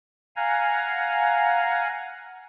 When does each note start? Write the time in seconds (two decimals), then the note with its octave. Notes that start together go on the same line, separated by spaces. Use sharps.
0.36 F5 F#5 G#5 A#5